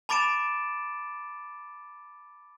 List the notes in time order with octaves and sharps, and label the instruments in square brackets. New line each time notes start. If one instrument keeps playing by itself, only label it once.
[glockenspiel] A5 B5 D6 A6 D7 E7